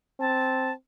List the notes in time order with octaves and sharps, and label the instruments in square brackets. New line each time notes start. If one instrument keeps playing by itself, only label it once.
[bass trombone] C4 [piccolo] A5